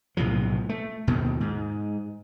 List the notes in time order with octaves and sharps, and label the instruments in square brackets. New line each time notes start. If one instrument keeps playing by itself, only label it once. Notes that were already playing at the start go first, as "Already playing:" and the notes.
[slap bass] B1 A2 C3 F3
A3
D#2 B2 D#3
G#2